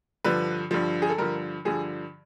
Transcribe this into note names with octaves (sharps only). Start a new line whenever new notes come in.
G2 D3 F3 B4
G2 D3 F3
G#4
A4
G2 D3 F3 A#4
G2 D3 F3 G#4